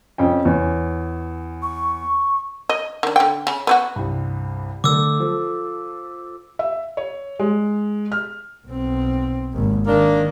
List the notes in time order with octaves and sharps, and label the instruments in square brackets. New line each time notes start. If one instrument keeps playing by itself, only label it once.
[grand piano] F2 C#4 G5
E2 C#5
[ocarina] C#6
[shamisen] D#5
D#3 D4
D3 G5
C#3
B3 C4 F#4
[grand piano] C2 G2
[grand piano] D3 A3 [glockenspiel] D6 E6
[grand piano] F3 A4
[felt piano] E5
C#5
G#3
F6
[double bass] B1 C4
G#1 D#2
[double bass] D#3 [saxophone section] A#3 D4